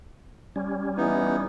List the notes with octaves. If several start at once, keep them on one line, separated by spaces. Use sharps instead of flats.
G3 C#4
E3 B3 D#4